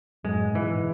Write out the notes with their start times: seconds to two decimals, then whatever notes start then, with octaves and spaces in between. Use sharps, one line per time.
0.24 F#2 A2 G#3
0.40 A2
0.45 G#2 B2
0.55 E3
0.65 G#2 B2